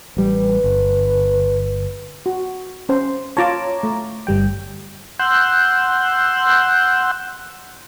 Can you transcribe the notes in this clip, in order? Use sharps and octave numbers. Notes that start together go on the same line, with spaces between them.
A1 G3 B4
G1
F#4
C#4 C5
F4 C#5 A5 A#5 D6
A3
G1 G3 G5
F#5 C6 E6 F#6 G6